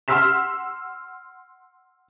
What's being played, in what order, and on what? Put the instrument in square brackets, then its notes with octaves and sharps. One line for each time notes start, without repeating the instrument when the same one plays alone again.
[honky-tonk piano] F#5 C6 E6 F6 B6 E7